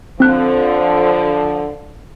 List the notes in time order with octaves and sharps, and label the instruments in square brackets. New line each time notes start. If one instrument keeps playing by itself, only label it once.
[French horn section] D3 F3 [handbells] C4 F#6